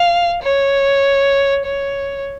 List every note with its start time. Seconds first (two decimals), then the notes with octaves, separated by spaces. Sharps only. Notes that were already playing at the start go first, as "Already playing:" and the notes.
Already playing: F5
0.43 C#5
1.66 C#5